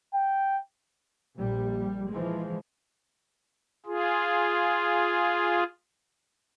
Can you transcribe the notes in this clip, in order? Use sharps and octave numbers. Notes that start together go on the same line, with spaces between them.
G5
A#1 G3
E3 F3 G#3
F4 G#4